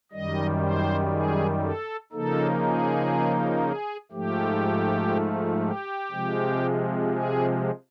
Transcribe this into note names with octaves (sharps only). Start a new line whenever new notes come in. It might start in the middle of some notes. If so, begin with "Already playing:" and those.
F#2 D#3 G3 D#5
C5
G#4
A4
C#3 F3 A#3 D#4 A4
G#4
G#4
G#2 F3 A3 G4
G4
C3 F3 G#3
G#4